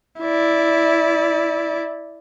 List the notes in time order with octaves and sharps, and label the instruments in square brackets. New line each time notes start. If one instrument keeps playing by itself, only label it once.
[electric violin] E4 D5